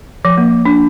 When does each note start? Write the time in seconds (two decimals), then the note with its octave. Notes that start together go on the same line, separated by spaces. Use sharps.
0.25 F3
0.38 A#3
0.65 D4